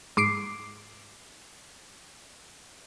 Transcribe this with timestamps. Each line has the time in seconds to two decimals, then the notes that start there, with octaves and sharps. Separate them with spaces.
0.17 G#2 D6 C7 D7